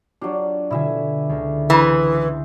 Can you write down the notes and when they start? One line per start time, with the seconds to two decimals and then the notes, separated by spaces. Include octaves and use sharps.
0.21 F#3 D4 F4 G4
0.71 B2 D3 E4 E5 G#5
1.29 C#2 D3
1.70 E3 G#4 C5 A#6